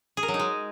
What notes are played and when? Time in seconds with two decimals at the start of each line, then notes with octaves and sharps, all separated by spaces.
0.17 G#4
0.23 A#4
0.28 F#3
0.34 D#4
0.39 G#3